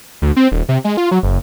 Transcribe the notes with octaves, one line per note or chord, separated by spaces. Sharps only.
D2
C4
D#1
C3
G#3
F4
F#3
F#1